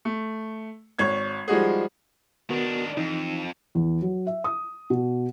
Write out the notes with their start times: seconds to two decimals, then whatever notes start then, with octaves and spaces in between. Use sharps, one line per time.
0.05 A3
0.99 G#1 C#5 G#6
1.48 F3 G3 G#3 D#4 F#4 G#4
2.50 D#3 B3 D4 F#4 A#4
2.97 F2 E3 D#4
3.75 E2
4.02 F#3
4.27 E5
4.44 D#6
4.90 B2